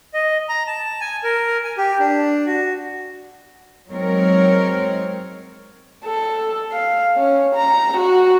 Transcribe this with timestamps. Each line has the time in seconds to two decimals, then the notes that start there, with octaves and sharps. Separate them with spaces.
0.14 D#5
0.49 A#5
0.67 A5
1.01 G#5
1.24 A#4
1.64 G#5
1.77 G4
2.00 D4
2.46 F#4
3.88 F#3 G#3 C4 D#4 A#4 C#5
6.04 A4
6.72 F5
7.16 C#4
7.55 A#5
7.97 F#4